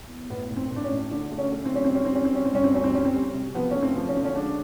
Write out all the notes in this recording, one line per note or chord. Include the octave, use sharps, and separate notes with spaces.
E2
A2 B3
A2
C4
A2
D4
C#4
A2
D3 D4
A3
C#4
A3
C4
F#3 C#4
C4
G3 C#4
C4
G3 C#4
C4
G3 C#4
C4
G2 C#4
C4
D2 C#4
C4
G3 C#4
C4
G3
C3
F3 B3
A3 C#4
C4
F3
C#4
D3
C#4
G#3 D4